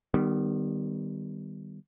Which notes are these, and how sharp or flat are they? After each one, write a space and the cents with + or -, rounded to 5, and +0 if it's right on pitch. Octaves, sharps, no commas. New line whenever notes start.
D#3 -25 G3 +0 B3 +15